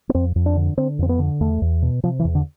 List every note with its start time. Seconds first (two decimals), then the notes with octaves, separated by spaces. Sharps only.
0.09 B3
0.14 F2 C4
0.36 F2
0.46 D4
0.56 D3
0.77 D3 C4
0.99 F2 C4
1.09 B3
1.19 D3
1.41 E2 A3
1.62 E2
1.82 B2
2.03 C3 F3
2.19 E3
2.24 E2
2.35 D3